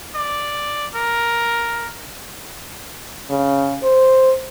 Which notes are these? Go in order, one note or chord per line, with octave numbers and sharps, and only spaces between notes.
D5
A#4
C#3
C5